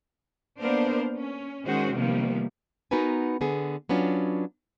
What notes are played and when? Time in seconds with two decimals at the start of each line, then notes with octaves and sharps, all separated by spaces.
0.60 A#3 B3 D4 A#4 C5
1.16 C#4
1.65 D#3 G#3 C#4 F#4 C5
1.93 C3 D#3 F3 G3 A#3 B3
2.91 B3 D#4 F#4 A#4 B4 G#5
3.41 D3 B3 G#4
3.89 F#3 B3 C#4 D4 F4